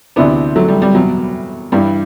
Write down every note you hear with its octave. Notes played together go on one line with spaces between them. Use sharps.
D2 C3 E3 B3 D4
F#3 A3
G3
G3
E2 B2 F#3
G2 E3 G3